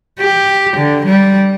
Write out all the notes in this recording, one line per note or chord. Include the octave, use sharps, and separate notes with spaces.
G4
D3
G3